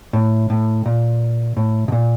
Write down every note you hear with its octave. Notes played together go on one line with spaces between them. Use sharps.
A2
A2
A#2
A2
B2
A#2